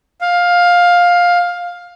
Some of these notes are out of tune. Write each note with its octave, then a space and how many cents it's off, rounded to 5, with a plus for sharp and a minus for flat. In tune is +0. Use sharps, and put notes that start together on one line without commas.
F5 +15